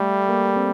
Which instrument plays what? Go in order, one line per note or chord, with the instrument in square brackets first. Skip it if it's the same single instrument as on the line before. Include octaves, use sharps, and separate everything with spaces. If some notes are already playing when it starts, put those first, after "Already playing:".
Already playing: [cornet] G3 [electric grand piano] A3
[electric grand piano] A#3
C4